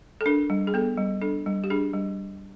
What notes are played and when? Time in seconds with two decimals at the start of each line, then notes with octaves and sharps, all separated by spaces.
0.21 A4
0.26 D4 A#4
0.50 G3
0.67 G#4
0.74 B3 A4
0.98 G3
1.21 D4 A4
1.46 G3
1.64 G4
1.70 D4 G#4
1.93 G3